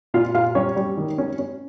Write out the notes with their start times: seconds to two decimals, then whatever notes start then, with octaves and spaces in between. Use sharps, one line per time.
0.14 A#2 F4 F5
0.34 A#2 F4 F5
0.55 G3 C#4 C#5
0.76 G3
0.97 D#3
1.18 C#4
1.39 C#4